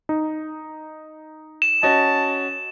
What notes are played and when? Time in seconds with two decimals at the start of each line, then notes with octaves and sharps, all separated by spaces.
0.09 D#4
1.62 E7
1.83 C#4 F#4 D#5 A5